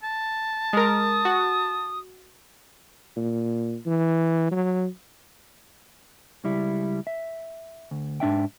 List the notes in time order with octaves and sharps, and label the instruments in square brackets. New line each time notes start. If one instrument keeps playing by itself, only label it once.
[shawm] A5
[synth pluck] G#3 A#4 [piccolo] D#6
[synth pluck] F#4
[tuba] A#2
E3
F#3
[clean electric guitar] C#2 G3 E4
E5
D2
G#2 D4 E5 G5